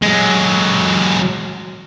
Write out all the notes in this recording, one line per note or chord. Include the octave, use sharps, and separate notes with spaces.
F#3 G#3